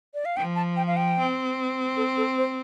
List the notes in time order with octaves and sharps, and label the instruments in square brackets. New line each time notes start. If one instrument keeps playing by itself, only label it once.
[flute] D5
F5
[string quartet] F3 [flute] G5
[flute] A5
G5
F5
G5
[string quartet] C4
[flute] A4
A4
C5